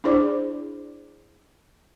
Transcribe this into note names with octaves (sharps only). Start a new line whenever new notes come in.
D4 E4 G#4 C5 D5 D6